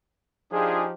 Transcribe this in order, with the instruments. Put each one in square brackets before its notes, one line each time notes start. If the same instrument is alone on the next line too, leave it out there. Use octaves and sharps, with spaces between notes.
[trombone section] F3 D#4 G4 [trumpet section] D4 F4 G#4